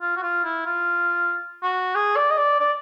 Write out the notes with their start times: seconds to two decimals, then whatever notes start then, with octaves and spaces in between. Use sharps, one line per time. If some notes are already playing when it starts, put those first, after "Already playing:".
0.02 F4
0.17 F#4
0.23 F4
0.44 E4
0.66 F4
1.63 F#4
1.95 G#4
2.16 D5
2.31 D#5
2.38 D5
2.60 D5